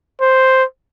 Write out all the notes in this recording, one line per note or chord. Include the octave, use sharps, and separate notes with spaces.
C5